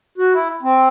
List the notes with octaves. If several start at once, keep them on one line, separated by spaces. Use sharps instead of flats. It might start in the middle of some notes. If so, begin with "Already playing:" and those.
F#4
E4
C4